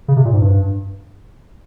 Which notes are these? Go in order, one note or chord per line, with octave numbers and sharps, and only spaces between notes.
C#3
C3
A#2
G#2
G2